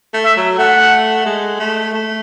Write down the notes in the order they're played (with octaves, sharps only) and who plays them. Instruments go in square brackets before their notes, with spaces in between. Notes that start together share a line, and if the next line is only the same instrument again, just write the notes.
[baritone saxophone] A3
[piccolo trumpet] E5
[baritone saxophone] F#3
[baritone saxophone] A3 [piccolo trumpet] F#5
[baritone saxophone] G#3
A3
A3